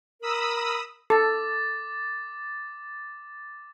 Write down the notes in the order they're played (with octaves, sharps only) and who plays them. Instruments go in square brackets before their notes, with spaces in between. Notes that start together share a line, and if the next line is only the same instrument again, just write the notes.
[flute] A#4 [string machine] B5 D#6 E6
[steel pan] A4 [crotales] D6 A6